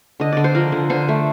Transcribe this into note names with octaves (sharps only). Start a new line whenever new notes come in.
D3 D#5
D3 D5
C5
F3 A#4
D3
D3 C5
A3